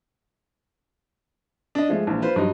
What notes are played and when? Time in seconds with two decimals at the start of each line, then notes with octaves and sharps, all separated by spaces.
1.75 D4 D#5
1.89 F3 G#3 A3
2.07 A#1 E3
2.22 F4 B4 C5
2.36 G2 F#3 D#5